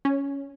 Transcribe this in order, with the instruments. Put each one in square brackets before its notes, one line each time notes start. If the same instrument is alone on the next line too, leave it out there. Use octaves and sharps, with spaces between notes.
[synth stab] C#4